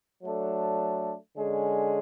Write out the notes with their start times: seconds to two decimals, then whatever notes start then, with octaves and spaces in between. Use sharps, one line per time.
0.23 F#3 A3 D4 A4
1.37 D3 G#3 C#4 G#4